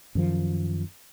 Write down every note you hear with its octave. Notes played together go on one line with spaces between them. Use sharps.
F#2 D#3 F3